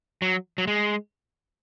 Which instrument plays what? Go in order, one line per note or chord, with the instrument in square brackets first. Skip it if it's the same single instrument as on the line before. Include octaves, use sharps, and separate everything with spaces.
[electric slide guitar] F#3
F#3
G#3